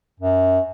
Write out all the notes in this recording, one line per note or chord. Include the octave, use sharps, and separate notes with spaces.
F#2